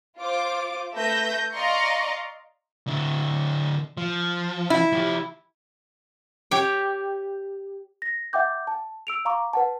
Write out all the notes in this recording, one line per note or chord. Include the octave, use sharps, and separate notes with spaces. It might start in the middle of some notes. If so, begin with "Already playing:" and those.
F4 C5 D6
A3 B4 E5 G6 A#6
D5 D#5 F5 A#5 C6 C#6
D3 E4
F3
E4
F3 G4
G4 C#5 G5
A#6
E5 F#5 G5 D6 G6
A5
E6 D7 F7
F5 A#5 C#6 D6
B4 F#5 A5